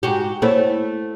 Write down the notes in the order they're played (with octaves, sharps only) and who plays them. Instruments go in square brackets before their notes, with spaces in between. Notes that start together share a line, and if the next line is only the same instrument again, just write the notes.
[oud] G#2 F#4 G4
[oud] A3 E4 [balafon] A#3 C5 C#5